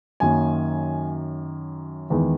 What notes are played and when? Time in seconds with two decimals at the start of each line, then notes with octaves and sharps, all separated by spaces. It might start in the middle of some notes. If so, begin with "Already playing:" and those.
0.20 F#2 D#3 F#3 A#3 G#5
2.10 E2 D#3 G#3